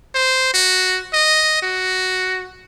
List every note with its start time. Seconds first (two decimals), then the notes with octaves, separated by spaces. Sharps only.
0.15 C5
0.54 F#4
1.13 D#5
1.62 F#4